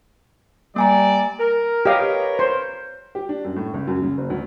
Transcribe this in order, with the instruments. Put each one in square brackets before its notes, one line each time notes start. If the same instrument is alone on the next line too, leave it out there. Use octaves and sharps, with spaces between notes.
[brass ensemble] G3 D5 [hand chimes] A#3 G#5 A#5
[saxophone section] A#4
[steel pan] G4 D#5 F5 [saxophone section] A#4 B4 C#5
[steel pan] C5
[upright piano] G4
D4
F#2
A2
C#2
F#2
C#3
F#1
D2